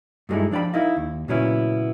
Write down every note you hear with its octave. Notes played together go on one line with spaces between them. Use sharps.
G2 F#3 G#3 A3 D#4 E4
F3 D4 D5 G5 B5
D#4 E4 A#4 D#5 F5
D#2
A#2 C#3 F#3 B3 C#4 E4